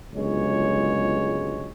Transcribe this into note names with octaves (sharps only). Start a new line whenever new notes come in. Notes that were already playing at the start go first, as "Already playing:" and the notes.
G1 C#2 F#3 G#3 C#5